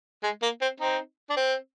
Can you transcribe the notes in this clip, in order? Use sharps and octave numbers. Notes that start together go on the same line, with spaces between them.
G#3
A#3
C4
C4 D#4
D4
C4